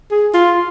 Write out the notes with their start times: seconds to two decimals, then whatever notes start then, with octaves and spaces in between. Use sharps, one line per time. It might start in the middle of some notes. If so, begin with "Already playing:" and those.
0.11 G#4
0.34 F4